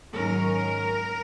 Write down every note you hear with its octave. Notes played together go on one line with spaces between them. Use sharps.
G#2 D#3 F#3 C#4 A#4